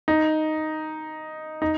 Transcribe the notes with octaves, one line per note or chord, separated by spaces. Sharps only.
D#4
D#4